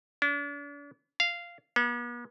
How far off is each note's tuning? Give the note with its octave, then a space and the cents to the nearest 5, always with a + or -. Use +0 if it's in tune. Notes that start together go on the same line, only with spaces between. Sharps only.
D4 -40
F5 -10
B3 -45